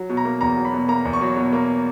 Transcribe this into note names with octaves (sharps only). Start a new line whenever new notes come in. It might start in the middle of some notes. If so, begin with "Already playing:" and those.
Already playing: F#3
B2
A#5
A#3
E2 A#5
F#3
B5
B2
A#3 A#5
E2
C#6
F#3
B2
A#3